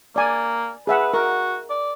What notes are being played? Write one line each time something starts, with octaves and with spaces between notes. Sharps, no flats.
A#3 D5 G#5
G#4 B4 E5 F#5
F#4 A#4
D5